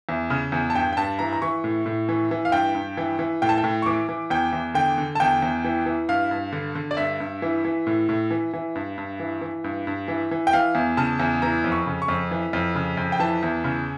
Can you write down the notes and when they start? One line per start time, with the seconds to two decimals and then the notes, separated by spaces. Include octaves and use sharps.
0.09 E2
0.30 C#3
0.52 E2
0.70 A5
0.75 G2 G5
0.93 G5
0.97 G2 A5
1.19 E3 A#5
1.33 A#5
1.42 E3 C#6
1.64 A2
1.86 A2
2.09 E3
2.31 E3
2.45 F5
2.52 G2 G5
2.75 G2
2.97 E3
3.19 E3
3.42 A2 G5
3.49 A5
3.58 G5
3.64 A2
3.82 C#6
3.86 E3 D6
4.09 E3
4.30 E2 G5
4.53 E2
4.74 D3 G5
4.98 D3
5.15 A5
5.20 E2 G5
5.42 E2
5.64 E3
5.86 E3
6.08 G2 F5
6.31 G2
6.53 D3
6.75 D3
6.91 D5
6.97 G2 E5
7.20 G2
7.42 E3
7.65 E3
7.87 A2
8.09 A2
8.31 E3
8.53 E3
8.75 G2
8.98 G2
9.20 E3
9.41 E3
9.64 G2
9.87 G2
10.08 E3
10.31 E3
10.47 G5
10.53 E3 F5
10.75 E2
10.97 C#3 A5
11.20 E2
11.42 E3 A#5
11.64 F2
11.72 C#6
11.86 C#3
12.02 C#6
12.08 F2
12.31 E3
12.53 F2
12.75 C#3
12.97 F2
13.12 G5
13.20 E3 A5
13.43 E2
13.64 C#3